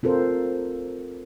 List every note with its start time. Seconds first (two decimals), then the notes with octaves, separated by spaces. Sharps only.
0.03 C4 F4 A4 A#4 C5